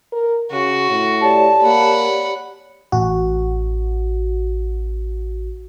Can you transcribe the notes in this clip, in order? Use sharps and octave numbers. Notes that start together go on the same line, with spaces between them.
A#4
C#3 F#4
A2
G4 C#5 D5 A5
A#3 F#5 B5
A1 F#4